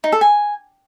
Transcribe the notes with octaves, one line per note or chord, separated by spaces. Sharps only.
D#4
A4
G#5